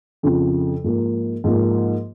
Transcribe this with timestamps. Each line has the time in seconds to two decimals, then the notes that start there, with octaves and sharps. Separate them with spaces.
0.23 F2 C#3 F3
0.84 G#2 F3 A#3
1.44 G#2 F3 A#3